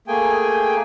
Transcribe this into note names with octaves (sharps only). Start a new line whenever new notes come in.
A3 A#3 G#4 G5 G#5